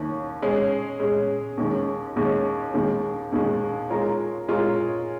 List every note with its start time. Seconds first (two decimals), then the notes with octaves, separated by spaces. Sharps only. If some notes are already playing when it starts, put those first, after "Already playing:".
Already playing: D#2 D#3 C#4
0.42 G#3 C#4 G#4
1.00 G#3 C#4 G#4
1.57 D#2 D#3 G#3 C#4
2.16 D#2 D#3 G#3 C#4
2.74 D#2 D#3 G#3
3.32 D#2 D#3 G#3
3.90 G#3 F4 A#4 C#5
4.48 G#3 F4 A#4 C#5